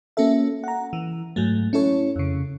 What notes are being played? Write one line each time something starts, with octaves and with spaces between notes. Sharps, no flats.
A#3 C#4 F#4 A4 E5
F#5 A#5
E3
G#2 F#3 A3
C#4 E4 A4 C#5
F2 C#3